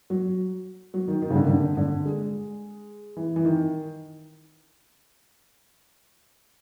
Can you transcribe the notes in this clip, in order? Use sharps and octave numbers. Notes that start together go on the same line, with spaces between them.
F#3
F#3
D#3
D#3
C#3
D3
D#3
D3
D3
G#3
E3
E3
D#3